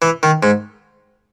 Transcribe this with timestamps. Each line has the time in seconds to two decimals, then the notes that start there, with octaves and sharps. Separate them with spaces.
0.02 E3
0.23 D#3
0.43 G#2